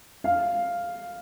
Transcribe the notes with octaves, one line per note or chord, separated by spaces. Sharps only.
F5